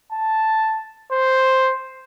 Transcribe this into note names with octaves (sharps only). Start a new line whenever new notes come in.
A5
C5